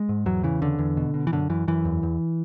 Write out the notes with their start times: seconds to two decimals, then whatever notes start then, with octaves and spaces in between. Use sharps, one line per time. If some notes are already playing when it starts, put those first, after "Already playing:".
Already playing: G#3
0.09 G#2
0.26 E2 F#3
0.43 C#3 E3
0.61 E2 D3
0.79 E2
0.97 B2
1.14 B2
1.27 E3
1.32 F#2 D3
1.50 F#2 E3
1.68 F#2 E3
1.85 E2
2.03 E2